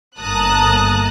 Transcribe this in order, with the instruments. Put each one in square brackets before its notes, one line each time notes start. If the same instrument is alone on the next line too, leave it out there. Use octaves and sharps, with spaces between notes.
[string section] G1 A#3 A5 A#5 D#6 F#6